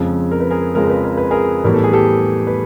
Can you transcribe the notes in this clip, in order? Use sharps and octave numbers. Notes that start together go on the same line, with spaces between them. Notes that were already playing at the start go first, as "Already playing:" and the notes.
Already playing: F2 C#3 F3 G#3
A#4
B4
G#4 A#4
F2 C#3 F3 G#3 A#4
B4
A#4
B4
G#4 A#4
A2 E3 G3 B3 A#4
A4
G#4
G4 A4
B4